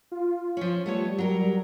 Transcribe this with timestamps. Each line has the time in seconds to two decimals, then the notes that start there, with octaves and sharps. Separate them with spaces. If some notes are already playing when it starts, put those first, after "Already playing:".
0.12 F4
0.57 F3 C#4
0.86 G3 A3 B3 C#5
1.18 F#3 A#4